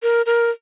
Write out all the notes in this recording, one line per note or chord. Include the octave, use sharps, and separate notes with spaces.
A#4
A#4